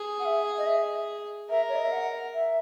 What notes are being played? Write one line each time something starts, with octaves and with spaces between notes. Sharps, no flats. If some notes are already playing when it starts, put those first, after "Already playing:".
Already playing: G#4
F#5
E5
D#5
E5
A#4 E5
C#5
D#5
E5
F#5
E5